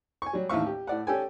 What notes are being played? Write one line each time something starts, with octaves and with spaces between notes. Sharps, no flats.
G#5 C#6
F#3 G3
A1 D#2 A2 E5 F5 C#6
G4
A2 D5 F#5
C#4 G4 A4 G5 G#5